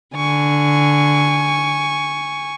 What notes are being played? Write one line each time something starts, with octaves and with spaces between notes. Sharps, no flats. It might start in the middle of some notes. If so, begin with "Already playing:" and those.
D3 G#5 C#6